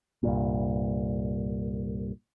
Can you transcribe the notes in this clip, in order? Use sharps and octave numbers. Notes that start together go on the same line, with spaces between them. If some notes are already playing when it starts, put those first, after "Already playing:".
C2 G2 A#2